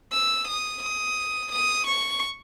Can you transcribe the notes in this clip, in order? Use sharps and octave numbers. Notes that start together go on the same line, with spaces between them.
E6
D#6
D#6
D#6
C#6